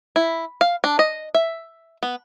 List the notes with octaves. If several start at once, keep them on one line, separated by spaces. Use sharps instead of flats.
E4
F5
D4
D#5
E5
B3